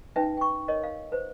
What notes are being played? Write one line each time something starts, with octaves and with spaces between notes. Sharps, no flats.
C#4 D#4 B4 E5 G5
G5 C#6
A#4 C#5 D#5
F5
B4 C5